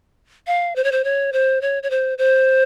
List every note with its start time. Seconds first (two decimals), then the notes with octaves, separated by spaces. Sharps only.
0.47 F5
0.76 C5
0.84 C#5
0.92 C5
1.04 C#5
1.33 C5
1.61 C#5
1.83 C#5
1.90 C5
2.18 C5